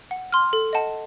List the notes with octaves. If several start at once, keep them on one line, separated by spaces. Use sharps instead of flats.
F#5
C6 F6
A4
D#5 F#5 A5